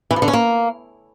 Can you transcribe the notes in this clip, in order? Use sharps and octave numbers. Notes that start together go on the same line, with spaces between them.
E3
F3
D3
C#4
A#3